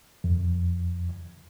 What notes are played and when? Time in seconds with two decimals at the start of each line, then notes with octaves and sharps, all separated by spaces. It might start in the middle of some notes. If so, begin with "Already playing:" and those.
0.24 F2